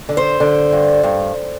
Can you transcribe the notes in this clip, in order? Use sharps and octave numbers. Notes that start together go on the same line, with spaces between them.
D3
C5
D3
G2
G2